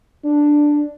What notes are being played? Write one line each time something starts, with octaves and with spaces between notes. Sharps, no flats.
D4